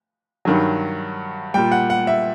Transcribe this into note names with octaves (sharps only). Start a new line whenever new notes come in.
G2 D#3 F#3
A#2 G3 G5
F#5
F#5
E5